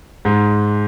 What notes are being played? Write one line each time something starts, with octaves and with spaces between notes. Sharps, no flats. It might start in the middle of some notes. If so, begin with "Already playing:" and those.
G#2